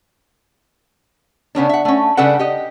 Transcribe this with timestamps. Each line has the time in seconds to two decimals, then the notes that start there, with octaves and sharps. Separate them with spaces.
1.55 C#3 B3 C#4 D4
1.69 E5 F#5
1.85 A3 C#4
2.17 C#3 G3 D4 A4 B4 F#5
2.39 G4 D#5